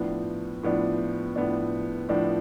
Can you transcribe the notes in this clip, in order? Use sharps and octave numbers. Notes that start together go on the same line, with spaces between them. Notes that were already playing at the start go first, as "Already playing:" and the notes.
Already playing: A2 F3 B3 D4
A2 F3 B3 D4
A2 F3 B3 D4
A2 F3 B3 D4